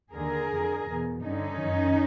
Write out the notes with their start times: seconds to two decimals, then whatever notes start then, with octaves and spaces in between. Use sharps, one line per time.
0.13 D#2 D3 G#4 A#4
0.50 F2 D3
0.86 E2 B2
1.23 G2 D3 C#4 D#4
1.60 F#2 D#3